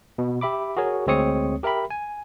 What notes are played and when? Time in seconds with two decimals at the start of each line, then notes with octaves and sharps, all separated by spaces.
0.18 B2
0.41 G4 E5 B5 D6
0.77 F#4 G#4 A#4 C#5
1.07 D2 G#3 C4 C#5 D#6 C#7
1.63 G4 A#4 E5 G5 B5
1.90 G#5